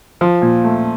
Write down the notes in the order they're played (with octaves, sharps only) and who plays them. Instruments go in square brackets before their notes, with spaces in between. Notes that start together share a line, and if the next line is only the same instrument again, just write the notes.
[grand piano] F3
A#2
A3